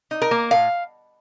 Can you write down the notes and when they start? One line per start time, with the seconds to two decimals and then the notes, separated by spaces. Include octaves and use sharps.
0.11 D#4
0.22 A#4
0.31 A#3
0.51 A2 F5